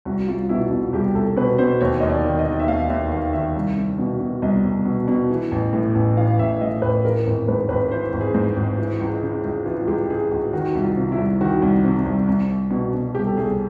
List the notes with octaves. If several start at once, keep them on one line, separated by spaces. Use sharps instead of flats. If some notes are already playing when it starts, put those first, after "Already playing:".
C2 F#4
C2 F4
B2 E4
B2 F4
C2 G4
C2 A4
B2 B4
B2 C5
D#2 C#5
D#2 D#5
D5
D#3
D#5
D#3
D#5
E5
D#2 F5
D#2 E5
D#3 F5
D#3 E5
C2
C2
B2
B2
C2 D#5
C2
B2
B2
E3
A1
A2
A1
E3 F5
A1 E5
A2 D#5
A1 B4
E3 A#4
G#1
G#2 B4
G#1 B4
E3 C5
G#1
G#4
G#2
G#1
E3
C#2
C#3
C#2
E3 F4
C#2 G4
C#3 G#4
C#2 F#4
D#3 F#4
C2
F4
C3
E4
C2
D#3 F#4
C2
C3
C2
C2
C2
B2
B2
C2 G4
A4
C2 G#4